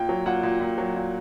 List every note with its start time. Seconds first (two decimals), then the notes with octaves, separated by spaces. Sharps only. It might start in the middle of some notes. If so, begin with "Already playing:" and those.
Already playing: A#2 G5
0.09 F#3
0.26 A#2 F#5
0.43 A#2
0.61 A#2
0.78 F#3
0.96 A#2